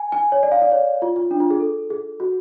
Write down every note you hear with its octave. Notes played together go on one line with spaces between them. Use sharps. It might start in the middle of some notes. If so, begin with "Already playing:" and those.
Already playing: G#5
G#5
C#5
D5
F5
D5
C#5
F4
F4
D4
F4
G#4
A4
G#4
F#4